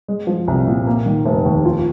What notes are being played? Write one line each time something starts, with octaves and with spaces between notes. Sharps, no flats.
G#3
F3
C2
A#2
A#3
D#3
F1
D#2
F4